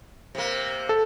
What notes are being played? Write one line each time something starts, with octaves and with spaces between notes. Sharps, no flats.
C3 A#3
A4